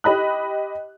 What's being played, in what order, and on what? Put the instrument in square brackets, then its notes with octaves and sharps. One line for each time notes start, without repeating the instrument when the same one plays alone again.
[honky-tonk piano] G4 D#5 B5 F#6